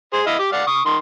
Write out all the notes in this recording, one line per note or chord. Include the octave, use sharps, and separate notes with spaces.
G#4 C5
E4 D#5 F5
G4 D6
D5 F5 F#5
C#6 D#6
D#3 C6